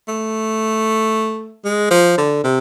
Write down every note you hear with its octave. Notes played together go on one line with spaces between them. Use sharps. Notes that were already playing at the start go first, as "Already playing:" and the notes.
A3
G#3
F3
D3
C3